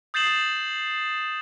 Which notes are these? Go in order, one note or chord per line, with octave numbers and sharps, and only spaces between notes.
D#6 G6 A6 C7 E7 F#7